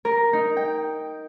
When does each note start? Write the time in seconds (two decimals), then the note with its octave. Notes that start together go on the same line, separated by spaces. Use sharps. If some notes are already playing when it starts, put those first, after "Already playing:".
0.05 A#4
0.33 D#4
0.57 G5